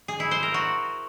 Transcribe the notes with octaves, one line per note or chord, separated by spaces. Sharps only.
G#4
E4
C5
A#4
F#4